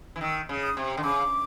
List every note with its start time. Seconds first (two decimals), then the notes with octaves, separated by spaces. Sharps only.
0.16 E3
0.21 D#3 E6
0.49 C#3
0.63 D#6
0.77 C3
0.97 D3
1.03 C#3 D6